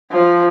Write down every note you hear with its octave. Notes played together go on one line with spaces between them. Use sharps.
F3